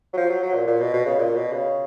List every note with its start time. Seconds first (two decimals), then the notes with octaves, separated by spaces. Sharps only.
0.13 F#3
0.17 F3
0.30 F#3
0.43 F#3
0.55 A#2
0.68 A#2
0.81 B2
0.94 B2
1.06 C#3
1.18 A#2
1.36 B2
1.52 C#3